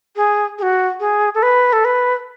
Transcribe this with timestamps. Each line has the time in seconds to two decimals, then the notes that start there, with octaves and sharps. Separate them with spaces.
0.16 G#4
0.58 G#4
0.62 F#4
1.00 G#4
1.35 A4
1.42 B4
1.73 A4
1.85 B4